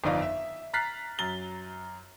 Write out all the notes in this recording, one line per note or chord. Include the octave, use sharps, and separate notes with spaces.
G1 F2 D#4 D5 F5
E5
A#5 F6 F#6 A6 B6 C7
F#2 A#5 A6 G7